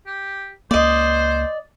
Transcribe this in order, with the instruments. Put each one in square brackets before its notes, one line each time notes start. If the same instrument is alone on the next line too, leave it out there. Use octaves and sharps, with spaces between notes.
[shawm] G4
[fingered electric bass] C#2 A#3 [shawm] C5 [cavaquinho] D5 D#5